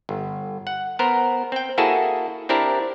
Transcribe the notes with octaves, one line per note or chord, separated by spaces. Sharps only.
G1
F#5
B3 A#4 C5
C4 G5
A#3 E4 F#4 G#4 A4 A5
C4 D4 E4 G4 A#4